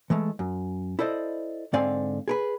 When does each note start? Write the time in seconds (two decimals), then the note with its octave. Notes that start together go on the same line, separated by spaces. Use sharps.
0.10 E3 G#3 A3
0.39 F#2
0.99 E4 A4 C5 D5 D#5
1.73 G#2 D3 C4 D5 F5 G#5
2.28 G#4 A#4 B4